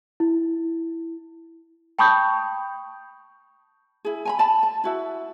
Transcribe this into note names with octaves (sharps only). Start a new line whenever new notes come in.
E4
G5 A5 B5 C#6 D#6 G6
E4 G#4
G#5 A#5 B5
D5 A5 B5
A5
E4 F#4 E5